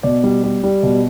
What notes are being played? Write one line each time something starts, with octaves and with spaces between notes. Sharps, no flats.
B2 D5
G3
G3
G3
B2